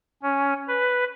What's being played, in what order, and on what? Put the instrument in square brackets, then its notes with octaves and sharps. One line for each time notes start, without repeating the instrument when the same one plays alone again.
[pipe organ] C#4
B4